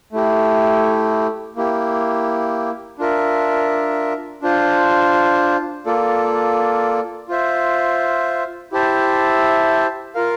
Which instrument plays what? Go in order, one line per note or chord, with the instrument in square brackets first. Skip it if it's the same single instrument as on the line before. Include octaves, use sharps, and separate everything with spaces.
[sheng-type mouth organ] A3 E4 G4
A#3 E4 G4
D4 F4 A#4 E5
D4 F4 C5
A#3 F4 A4 D5
F4 C5 E5
E4 G4 C5 E5 A5
F4 A#4 F5